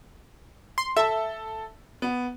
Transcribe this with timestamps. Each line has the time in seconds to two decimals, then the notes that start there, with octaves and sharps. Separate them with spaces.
0.78 C6
0.97 A4 E5 A5
2.02 B3